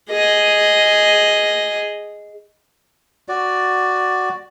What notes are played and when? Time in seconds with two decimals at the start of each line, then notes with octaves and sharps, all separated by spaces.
0.10 G#4 D#5
3.28 F#4 D5